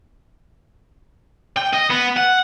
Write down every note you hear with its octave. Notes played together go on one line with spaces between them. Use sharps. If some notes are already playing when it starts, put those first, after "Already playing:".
G5
D#5
B3
F#5